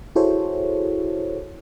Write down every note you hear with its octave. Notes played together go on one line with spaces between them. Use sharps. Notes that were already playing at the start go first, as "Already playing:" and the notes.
E4 F#4 G#4 A4 C5 C#5